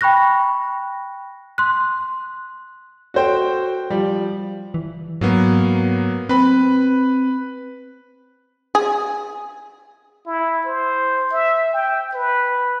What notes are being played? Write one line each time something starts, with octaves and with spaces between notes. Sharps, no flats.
G5 B5 C#6 F#6 A#6
C6 F#6
F#4 A4 C5 G5
F3 G3
E3
G#2 F#3 A#3 B3
C4 B4 B5
G#4
E4
C5
E5
G5
B4